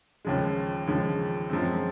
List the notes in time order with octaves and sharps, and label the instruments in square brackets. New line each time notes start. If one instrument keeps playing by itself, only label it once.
[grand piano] D#2 C#3 F3 G#3
D#2 C#3 F3 G#3
F#2 F3 G#3 C4